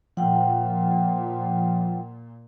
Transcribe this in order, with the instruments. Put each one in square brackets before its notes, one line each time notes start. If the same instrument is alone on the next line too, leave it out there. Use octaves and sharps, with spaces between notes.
[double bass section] A#2 [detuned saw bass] F3 [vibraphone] F#5 G5